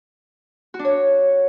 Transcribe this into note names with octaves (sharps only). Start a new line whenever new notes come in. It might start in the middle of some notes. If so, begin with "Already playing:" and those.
F#4
D4
C#5